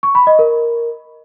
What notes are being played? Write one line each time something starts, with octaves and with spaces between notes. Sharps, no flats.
C#6
B5
D#5
A#4